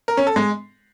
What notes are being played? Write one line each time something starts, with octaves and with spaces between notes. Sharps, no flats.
A#4
C#4
A4
G#3